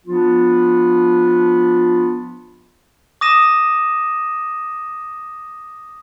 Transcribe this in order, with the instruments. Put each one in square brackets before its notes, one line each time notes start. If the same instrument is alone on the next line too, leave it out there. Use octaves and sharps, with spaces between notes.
[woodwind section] F3 B3 D4 F4
[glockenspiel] D6 D#6 A#6 D#7 E7